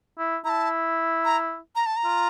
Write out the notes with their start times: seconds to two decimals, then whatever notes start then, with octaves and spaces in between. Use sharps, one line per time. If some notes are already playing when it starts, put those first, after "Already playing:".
0.18 E4
0.45 E4 A5 A#5
1.25 A#5
1.76 A#5
1.86 A5
1.97 A#5
2.05 F4